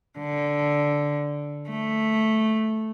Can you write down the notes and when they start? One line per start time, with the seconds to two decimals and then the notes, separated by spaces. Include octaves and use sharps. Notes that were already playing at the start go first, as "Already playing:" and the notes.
0.19 D3
1.69 A3